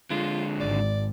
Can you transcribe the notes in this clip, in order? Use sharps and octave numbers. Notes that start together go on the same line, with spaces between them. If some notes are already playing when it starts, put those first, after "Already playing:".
D3 G#3 F4
G#1 D5